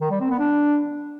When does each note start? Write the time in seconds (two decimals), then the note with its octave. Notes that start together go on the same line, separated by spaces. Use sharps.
0.01 D#3
0.10 G3
0.20 C4
0.30 B3
0.39 D4